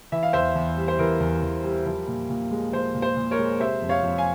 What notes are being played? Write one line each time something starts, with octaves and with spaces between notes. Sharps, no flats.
E3 E5
F5
E2 C5 E5
E2
G3
C5
E3 A#4
E2
E2
G3
F3
A#2
A#2
G#3
F3 C5
A#2
C5
A#2
A#4 C#5
G#3
C3 C5 E5
F2
C#5 F5
F2
F5 G#5